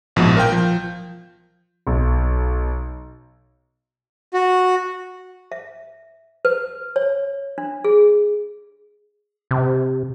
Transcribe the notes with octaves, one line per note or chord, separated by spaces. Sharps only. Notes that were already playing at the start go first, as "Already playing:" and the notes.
A#1 G#2 B2 F3
A#4 F5 G5 G6
F3
B1
F#4
E5
B4
C#5
D4
G#4
C3